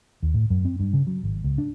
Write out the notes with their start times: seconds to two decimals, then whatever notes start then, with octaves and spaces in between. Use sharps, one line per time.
0.23 D#2
0.34 A2
0.50 F#2
0.65 C4
0.80 G2
0.93 C#3
1.07 F#3
1.23 G#1
1.44 C#2
1.58 D4